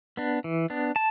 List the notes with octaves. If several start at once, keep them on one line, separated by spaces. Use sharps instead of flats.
B3 D4
E3
B3 D4
A5